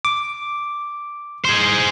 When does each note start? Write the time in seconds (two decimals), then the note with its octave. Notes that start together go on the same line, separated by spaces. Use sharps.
0.05 D6
1.45 G#4 C5